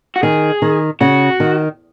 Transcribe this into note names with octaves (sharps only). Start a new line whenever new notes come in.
F#4
D#3 G#4
D#3
C#3 F#4
D#3